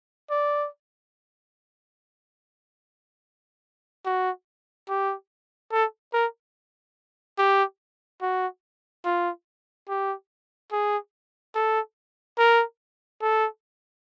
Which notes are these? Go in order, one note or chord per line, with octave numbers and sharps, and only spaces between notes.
D5
F#4
G4
A4
A#4
G4
F#4
F4
G4
G#4
A4
A#4
A4